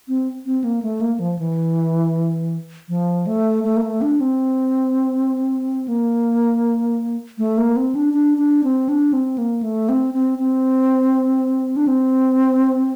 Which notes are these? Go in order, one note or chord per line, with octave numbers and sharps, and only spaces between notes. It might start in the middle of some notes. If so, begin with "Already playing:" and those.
C4
C4
A#3
A3
A#3
F3
E3
F3
A3
A3
A#3
A3
D4
C4
A#3
A3
A#3
C4
D4
D4
D4
C4
D4
C4
A#3
A3
C4
C4
C4
D4
C4